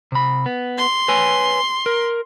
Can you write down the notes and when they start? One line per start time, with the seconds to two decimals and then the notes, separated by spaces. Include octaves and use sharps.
0.12 C3 B5
0.46 B3
0.78 C6
1.08 B4 C#5 G#5
1.86 A#4